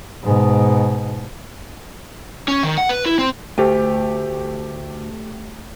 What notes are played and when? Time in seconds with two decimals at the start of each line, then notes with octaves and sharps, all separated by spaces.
0.24 G#2 B2
2.48 C#4
2.63 D#3
2.78 F#5
2.89 B4
3.06 E4
3.19 C4
3.58 D2 A3 G4